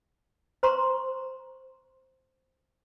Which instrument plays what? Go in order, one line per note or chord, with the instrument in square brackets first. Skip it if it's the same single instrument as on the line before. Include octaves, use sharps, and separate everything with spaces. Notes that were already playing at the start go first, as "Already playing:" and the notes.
[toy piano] C5 A#5 C6 C#6